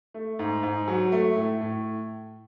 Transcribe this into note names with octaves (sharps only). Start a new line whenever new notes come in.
A3
G#2
G#2
F#3
A3
A2
A2